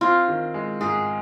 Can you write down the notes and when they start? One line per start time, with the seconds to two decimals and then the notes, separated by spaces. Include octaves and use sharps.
0.01 C4 F4
0.28 D#3
0.54 G#3
0.81 G#2 G#4